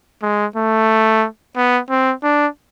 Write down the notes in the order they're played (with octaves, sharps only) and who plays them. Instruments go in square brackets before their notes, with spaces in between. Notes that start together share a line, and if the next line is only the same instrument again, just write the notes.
[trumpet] G#3
A3
B3
C4
D4